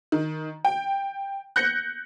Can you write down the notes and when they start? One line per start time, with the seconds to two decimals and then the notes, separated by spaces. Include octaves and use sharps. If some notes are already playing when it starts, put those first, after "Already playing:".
0.12 D#3
0.65 G5
1.56 F#6 G6 A#6 C#7